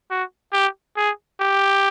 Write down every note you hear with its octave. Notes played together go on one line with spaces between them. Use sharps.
F#4
G4
G#4
G4